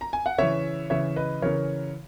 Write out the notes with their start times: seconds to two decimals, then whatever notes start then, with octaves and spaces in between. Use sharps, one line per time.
0.01 A#5
0.13 G#5
0.26 F#5
0.38 C#3 E3 C#5 E5
0.90 C#3 E3 C#5 E5
1.16 B4 D#5
1.42 C#3 E3 A#4 C#5